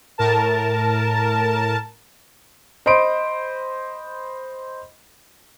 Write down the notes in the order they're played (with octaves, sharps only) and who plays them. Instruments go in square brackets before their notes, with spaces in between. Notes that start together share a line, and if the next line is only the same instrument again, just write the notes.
[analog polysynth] A2 A#4 A5
[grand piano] C5 D#5 B5 C6 D7